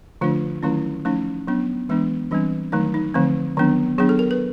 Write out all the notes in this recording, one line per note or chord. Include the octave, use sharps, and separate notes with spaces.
D3 F3 A3 D4 F4
D#3 F#3 A3 C#4 E4
F3 A3 C#4 D#4
F#3 B3 D4
E3 G#3 B3 D4
E3 G3 C4 D4
D#3 F#3 A3 D#4
D#4
D3 F3 A3 C4
D#3 F#3 B3 D4
F#3 B3 D4 G#4
A4
A#4
B4